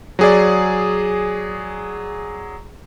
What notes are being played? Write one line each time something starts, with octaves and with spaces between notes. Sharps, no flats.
F#3 G#4 D5